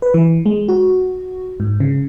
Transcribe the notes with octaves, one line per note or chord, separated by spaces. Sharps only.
B4
E3
G#3
F#4
G#2
C#3